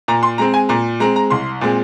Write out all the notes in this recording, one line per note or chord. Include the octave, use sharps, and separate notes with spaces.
A#2 A#5
C6
G#3 C4 A#5
G#5
A#2 A#5
G#3 C4 A#5
A#5
C2 C6
A#2 G#3 C4